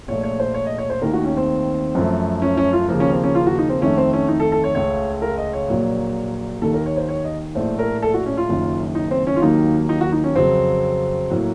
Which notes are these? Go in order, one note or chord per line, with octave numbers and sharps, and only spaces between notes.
A#1 A#2 A3 C#5
C#5
C5
C#5
D#5
C#5
C5
D#2 D#3 A3 A#4
F#4
C#4
C4
F#2 F3 A3
C#4
C#4
F4
D#2 C#3 F3 A#3
C#4
C4
C#4
F4
F#4
D#4
C4
F2 D#3 A3 C#4
C4
C#4
D#4
A4
A4
C#5
C#2 C#3 A3 C#5
A#4
D#5
C#5
A#1 A#2 F#3 A#3
D#2 D#3 A#3 A4
A#4
C#5
C5
C#5
D#5
A#1 A2 A3 C5
A#4
A4
F#4
C#4
F4
F#1 F#2 D#3
D#4
C4
C#4
F4
D#2 D#3 F#3 A#3 D#4
D#4
F#4
D#4
C#4
F2 C#3 F#3 C4
A2 F#3 A#3